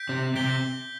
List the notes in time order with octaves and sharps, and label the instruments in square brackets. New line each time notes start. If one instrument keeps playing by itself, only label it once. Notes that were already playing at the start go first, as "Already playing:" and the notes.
Already playing: [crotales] G6 B6 D7
[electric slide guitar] C3 C4
[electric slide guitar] C3 C4 [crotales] G6 B6 D7 G7